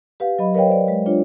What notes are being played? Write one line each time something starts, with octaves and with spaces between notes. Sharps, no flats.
G4 B4 F5 F#5
F#3 D#5 B5
A#4 B4 C#5 D#5 F5 G5
C5 D5
G#3
D4 F4 C#5